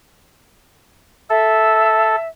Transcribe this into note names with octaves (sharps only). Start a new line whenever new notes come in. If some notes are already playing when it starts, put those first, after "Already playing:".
A4 E5